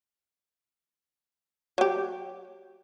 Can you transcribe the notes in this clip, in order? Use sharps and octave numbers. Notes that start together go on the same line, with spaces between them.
F#3 G4